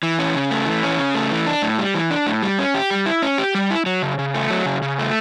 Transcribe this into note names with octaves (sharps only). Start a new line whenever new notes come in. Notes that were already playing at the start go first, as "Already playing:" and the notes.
E3
C#4
C#3
A3
E3
C#4
C#3
A3
E3
D4
A2
G3
E3
D4
A2
G3
C#4
G4
G3
E4
C#4
G4
G3
E4
F#3
C#3
C#3
A3
F#3
C#3
C#3
A3